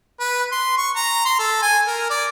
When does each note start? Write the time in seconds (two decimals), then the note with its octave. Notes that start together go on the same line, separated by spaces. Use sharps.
0.20 B4
0.52 C6
0.78 C#6
0.96 A#5
1.25 C6
1.39 A4
1.63 G#5
1.87 A#4
2.10 D5